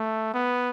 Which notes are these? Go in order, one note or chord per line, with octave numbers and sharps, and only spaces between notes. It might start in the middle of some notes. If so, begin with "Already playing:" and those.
Already playing: A3
B3